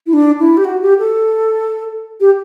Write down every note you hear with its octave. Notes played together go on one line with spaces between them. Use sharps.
E4
D4
E4
G4
F#4
G4
A4
G4